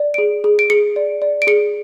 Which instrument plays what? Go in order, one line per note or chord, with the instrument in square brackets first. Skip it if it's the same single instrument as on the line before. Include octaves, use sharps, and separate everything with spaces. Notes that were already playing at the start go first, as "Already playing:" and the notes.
Already playing: [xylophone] D5
G#4 D7
G#4
D7
G#4 C#7
D5
D5
D7
G#4 C#7